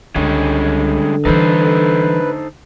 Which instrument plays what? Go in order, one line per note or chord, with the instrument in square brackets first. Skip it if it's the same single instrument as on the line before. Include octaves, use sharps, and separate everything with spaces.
[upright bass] C#2 [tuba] D3 [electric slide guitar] G3 G#3 C#4
[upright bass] E3 G3 [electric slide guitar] D#4 A4 C5 [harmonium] B4